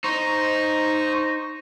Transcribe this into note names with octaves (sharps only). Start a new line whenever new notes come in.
D#4 C5 C#6